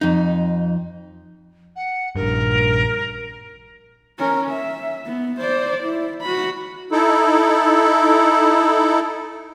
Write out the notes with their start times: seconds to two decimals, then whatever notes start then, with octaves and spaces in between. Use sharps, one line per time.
0.01 F2 D#4
1.76 F#5
2.15 A#1 G2 A#4
4.19 C#4 A#4
4.50 E5
5.05 B3
5.40 C5 D5
5.83 E4
6.21 F#4 B5
6.92 D#4 E4 A4